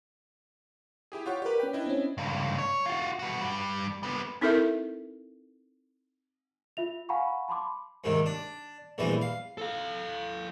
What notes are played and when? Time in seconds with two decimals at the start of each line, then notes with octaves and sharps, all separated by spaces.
1.12 E4 G4 G#4
1.26 F4 G4 C#5 F#5 G5 C#6
1.42 G4 A#4 B4 D5
1.60 C#4 G5
1.73 D4 E4 D#5
1.86 C4 C#4
2.18 C#2 G2
2.58 C#5
2.86 F4 F#4
3.19 G3 F#4
3.41 G2 G3
4.03 G3 B3
4.41 C4 D#4 E4 A4 A#4 E5
6.77 F4 E5 F7
7.09 F5 F#5 G#5 A#5 B5 C#6
7.48 A5 B5 C6 D6
8.04 D#2 G#2 C3 D#3
8.26 D4
8.98 A#1 E2 E3 G3 G#3
9.21 F5
9.58 A4 F5